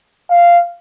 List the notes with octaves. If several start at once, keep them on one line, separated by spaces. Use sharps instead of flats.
F5